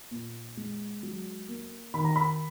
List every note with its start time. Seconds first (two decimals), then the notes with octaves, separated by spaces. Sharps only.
0.11 A#2
0.57 G#3
1.03 F#3
1.49 A#3
1.94 D#3 B5
2.05 A#5
2.16 B5